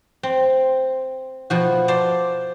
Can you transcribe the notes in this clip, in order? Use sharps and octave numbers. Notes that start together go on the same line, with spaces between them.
C4
B2 F3 F#4
C5 D5 A5 C6